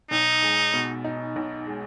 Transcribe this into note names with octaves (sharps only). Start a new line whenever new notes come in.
B1 D#4
G#3
B2
D#4
B1
G#3